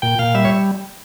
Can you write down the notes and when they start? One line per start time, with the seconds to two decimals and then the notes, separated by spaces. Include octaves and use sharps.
0.02 A#2 G5
0.19 A#2 F5
0.35 G3 E5
0.45 C#5